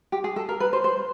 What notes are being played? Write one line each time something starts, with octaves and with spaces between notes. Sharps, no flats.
G4
G#4
A4
A#4
B4
C5
C5